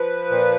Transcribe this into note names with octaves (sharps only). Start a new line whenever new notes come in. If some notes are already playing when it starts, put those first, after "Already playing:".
Already playing: F3 B4
A#2